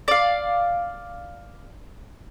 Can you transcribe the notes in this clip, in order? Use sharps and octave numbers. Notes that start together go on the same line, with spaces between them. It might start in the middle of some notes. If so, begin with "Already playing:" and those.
D5 F5